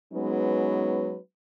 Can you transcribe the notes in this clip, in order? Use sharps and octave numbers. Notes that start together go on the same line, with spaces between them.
F#3 G#3 B3 C#4 D#4 B4